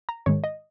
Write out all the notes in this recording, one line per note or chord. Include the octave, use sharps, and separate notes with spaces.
A#5
G#2 D#3 G#3 C#5
D#5